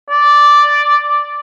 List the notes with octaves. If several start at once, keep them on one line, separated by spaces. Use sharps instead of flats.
D5